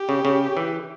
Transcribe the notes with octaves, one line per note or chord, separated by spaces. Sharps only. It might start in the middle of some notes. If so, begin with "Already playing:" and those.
Already playing: G4
C#3
C#3
E3